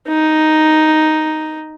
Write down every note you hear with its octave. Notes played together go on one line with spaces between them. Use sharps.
D#4